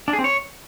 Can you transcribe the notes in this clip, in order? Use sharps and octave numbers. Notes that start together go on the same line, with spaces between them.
D4
G#4
C4
C#5